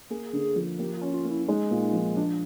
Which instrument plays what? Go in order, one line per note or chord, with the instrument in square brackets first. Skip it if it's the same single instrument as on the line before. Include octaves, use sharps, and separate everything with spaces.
[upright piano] A#3 [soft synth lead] G#4
[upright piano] D3
F3
[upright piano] A#3 [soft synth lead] G4
[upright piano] C#4 [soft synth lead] F4
[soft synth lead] F4
[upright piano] A#3
[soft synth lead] E4
[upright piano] G#3 [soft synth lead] D#4
[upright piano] A#2
F3
[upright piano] F3 [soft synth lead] D4